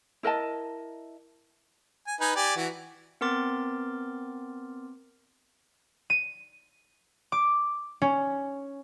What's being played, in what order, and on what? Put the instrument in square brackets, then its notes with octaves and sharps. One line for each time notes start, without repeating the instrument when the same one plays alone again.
[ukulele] E4 A#4 D#5 A5
[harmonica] G#5
D#4 B4 G#5
G4 D5 G#5
E3 F#4
[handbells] B3 C4 A#4 C6 D6 A6
[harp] D#7
D6
C#4